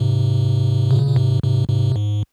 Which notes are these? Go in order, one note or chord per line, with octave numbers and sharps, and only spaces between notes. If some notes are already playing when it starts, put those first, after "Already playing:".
Already playing: G#2 C3
A#2 C#3
A#2
G#2 C3
G#2 C3
G#2 C3
G#2